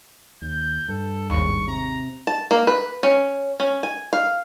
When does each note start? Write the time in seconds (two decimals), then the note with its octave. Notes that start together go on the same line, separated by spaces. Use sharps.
0.42 D#2 G6
0.88 G2 A4
1.30 G#1 D#2 C#6
1.67 C3 A#5
2.27 A5
2.51 A#3
2.67 B4
3.03 C#4
3.60 C#4
3.83 G#5
4.13 F5